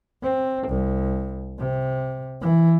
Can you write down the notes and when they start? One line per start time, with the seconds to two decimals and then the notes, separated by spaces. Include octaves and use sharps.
0.22 C4
0.68 C2
1.58 C3
2.41 E3